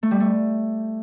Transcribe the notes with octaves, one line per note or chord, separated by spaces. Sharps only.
A3
G3
A3